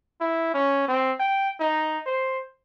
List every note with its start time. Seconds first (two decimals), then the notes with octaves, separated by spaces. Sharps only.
0.21 E4
0.54 C#4
0.89 C4
1.20 G5
1.60 D#4
2.07 C5